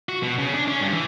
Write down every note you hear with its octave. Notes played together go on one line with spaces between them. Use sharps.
F#4
B2
C#3
D4
C#4
G2
E3